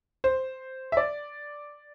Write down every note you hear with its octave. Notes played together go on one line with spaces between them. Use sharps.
C5
E5
D5